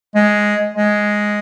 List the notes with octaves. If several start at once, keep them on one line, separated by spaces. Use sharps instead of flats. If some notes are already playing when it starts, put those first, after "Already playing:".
G#3
G#3